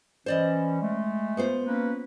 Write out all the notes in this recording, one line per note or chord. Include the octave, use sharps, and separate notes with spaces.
E3 C#4 C5 D5 D#5
G#3 A3
B3 F4 C5
A#3 C#4 B4